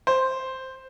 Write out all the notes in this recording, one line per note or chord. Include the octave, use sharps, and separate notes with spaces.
C5